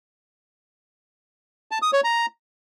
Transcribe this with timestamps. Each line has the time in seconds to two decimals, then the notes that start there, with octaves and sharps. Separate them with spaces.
1.71 A5
1.82 D#6
1.93 C#5
2.04 A#5